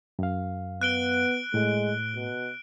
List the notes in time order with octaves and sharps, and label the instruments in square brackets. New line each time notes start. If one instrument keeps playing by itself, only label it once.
[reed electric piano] F#2 F5
[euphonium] B3 [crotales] F#6 D7 G7
[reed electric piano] A2 [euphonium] G#3
[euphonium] B2